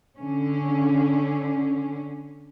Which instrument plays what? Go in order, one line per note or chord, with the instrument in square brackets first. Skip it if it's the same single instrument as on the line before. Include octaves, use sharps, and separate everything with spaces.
[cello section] D3 C#4